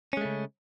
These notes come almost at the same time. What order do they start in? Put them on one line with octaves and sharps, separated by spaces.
C#4 G#3 A3 C#3